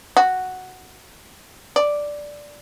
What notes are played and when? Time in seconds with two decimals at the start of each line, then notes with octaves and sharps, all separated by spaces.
0.17 F#4
1.76 D5